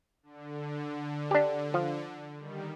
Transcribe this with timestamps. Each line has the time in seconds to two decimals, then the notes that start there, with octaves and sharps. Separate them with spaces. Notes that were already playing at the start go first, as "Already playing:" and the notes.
0.23 D3
1.31 D4 G4
1.74 F3
2.37 D#3 G3